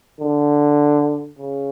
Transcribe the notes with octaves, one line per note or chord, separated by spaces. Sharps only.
D3
C#3